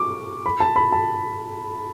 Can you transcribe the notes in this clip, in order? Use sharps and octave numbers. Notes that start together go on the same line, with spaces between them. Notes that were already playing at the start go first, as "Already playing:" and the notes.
Already playing: C#6 D6
B5
A5
B5
A5